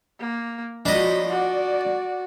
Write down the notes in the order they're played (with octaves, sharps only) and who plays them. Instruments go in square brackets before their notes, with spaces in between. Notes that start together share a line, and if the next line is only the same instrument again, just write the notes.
[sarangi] A#3
[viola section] F3 F#3 [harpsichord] D4 D#5 [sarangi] B5
[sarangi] F#4 [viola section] D5